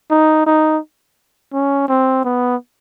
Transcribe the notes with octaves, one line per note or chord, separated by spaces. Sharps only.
D#4
D#4
C#4
C4
B3